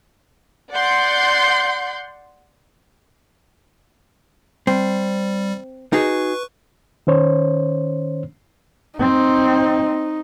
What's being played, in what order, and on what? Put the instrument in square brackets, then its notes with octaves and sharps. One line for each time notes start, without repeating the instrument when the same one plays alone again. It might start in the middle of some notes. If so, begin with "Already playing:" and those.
[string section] D5 F#5 C6 G6
[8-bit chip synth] G3 [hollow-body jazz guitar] C4
[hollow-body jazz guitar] D#4 F#4 G#4 [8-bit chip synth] B4 C#6
[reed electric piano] D#3 C#4 C5 C#5
[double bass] C4 [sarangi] D#4